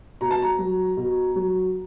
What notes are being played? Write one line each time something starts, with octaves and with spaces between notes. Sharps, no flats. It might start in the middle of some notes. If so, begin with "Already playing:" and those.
B2 A#5
A5
A#5
F#3
B2
F#3